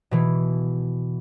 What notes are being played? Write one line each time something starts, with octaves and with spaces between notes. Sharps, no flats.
B2 E3